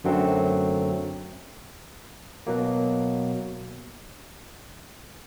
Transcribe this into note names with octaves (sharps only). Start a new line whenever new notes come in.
F#2 D3 F#3 A3 C4
B2 F#3 A#3